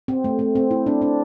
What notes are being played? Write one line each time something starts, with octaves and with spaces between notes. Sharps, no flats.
C4
A3
A3
C4
E4
D4
D4